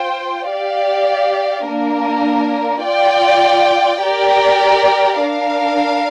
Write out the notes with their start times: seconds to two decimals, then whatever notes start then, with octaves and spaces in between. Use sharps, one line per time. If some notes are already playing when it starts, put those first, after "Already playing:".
Already playing: F4 C5 G5
0.49 G4 D5 F5
1.66 A#3 D4 A#4
2.84 F4 D5 G5
4.02 G4 A#4 D5 G5
5.19 D4 A#4 F5